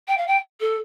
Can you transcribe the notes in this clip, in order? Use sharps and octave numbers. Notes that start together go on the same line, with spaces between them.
G5
F5
G5
A4